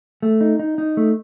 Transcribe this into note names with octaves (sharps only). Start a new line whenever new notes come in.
A3
D#4
D#4
D#4
A3